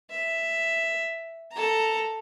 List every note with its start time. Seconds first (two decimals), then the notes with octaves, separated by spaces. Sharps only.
0.10 E5
1.52 A4 A#5